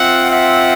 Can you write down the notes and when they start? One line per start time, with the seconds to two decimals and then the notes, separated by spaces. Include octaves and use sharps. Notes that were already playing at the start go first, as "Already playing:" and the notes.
Already playing: C4 F4 E5 F#5
0.31 E5 F#5